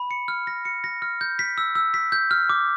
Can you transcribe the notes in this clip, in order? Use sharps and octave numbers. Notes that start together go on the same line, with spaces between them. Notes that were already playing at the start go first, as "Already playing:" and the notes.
Already playing: B5
C#7
F6
A#6
C#7
A#6
F6
G6
B6
E6
E6
B6
G6
F6
D6